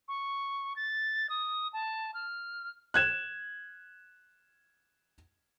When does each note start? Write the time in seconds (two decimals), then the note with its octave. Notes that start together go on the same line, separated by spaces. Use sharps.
0.08 C#6
0.76 A6
1.30 D#6
1.73 A5
2.14 F6
2.94 F#6 G#6 E7